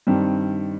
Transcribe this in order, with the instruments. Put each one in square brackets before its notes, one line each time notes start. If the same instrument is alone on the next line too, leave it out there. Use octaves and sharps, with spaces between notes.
[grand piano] G2 D#3 G3 C4